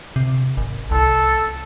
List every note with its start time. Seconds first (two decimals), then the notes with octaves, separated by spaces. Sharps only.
0.16 C3
0.57 G#1
0.91 C2 A4